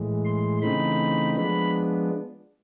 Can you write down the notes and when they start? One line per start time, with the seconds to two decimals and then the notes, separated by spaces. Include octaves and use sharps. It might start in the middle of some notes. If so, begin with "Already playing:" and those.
Already playing: A2 E3 G#3
0.25 C6
0.62 C#3 E3 A3 C4 D#4 B5
1.36 F3 G#3 B3 D4 B5